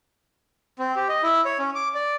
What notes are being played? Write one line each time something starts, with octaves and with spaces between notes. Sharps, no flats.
C4
G4
D#5
E4
C#5
C#4
D6
D5